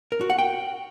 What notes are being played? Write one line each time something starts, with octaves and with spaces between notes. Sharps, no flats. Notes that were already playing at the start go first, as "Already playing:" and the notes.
A#4
F#4
F#5
G5